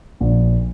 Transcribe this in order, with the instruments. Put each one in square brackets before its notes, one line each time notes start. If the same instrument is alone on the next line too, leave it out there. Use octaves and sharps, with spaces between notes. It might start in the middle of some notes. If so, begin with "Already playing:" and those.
[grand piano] A#1